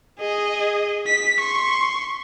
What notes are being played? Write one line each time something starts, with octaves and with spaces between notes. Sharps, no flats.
G#4 D#5
B6
C6 C#6